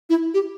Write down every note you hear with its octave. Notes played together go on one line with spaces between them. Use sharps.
E4
G4